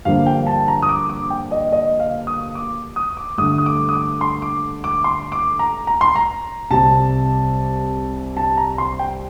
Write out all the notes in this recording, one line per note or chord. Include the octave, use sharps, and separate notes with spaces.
G2 D3 F3 A#3 F5
G5
A5
A#5
D#6
D6
D6
G5
D#5
D#5
F5
D#6
D6
D#6
D6
G2 D3 A3 D#6
D#6
D6
D#6
D6
C6
D6
D6
C6
D6
A#5
A#5
C6
A#5
C2 C3 G3 A5
A5
A#5
C6
G5